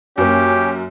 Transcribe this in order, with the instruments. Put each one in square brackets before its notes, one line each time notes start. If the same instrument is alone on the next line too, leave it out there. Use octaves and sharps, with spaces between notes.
[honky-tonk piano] F#2 A#3 [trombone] C#4 [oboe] G4